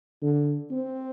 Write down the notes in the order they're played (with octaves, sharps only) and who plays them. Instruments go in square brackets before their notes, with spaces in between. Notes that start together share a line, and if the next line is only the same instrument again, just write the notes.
[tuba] D3
C4